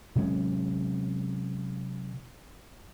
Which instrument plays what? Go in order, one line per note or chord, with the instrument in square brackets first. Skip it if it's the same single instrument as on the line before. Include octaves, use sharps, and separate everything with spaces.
[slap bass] C3 F#3 G#3 C#4